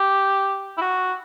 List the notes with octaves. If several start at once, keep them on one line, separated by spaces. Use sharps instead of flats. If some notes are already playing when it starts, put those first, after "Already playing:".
Already playing: G4
E4
F#4